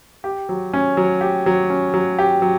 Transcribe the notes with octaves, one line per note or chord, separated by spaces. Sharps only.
G4
F#3
C#4
F#3
G4
F#3
C#4
F#3
G4
F#3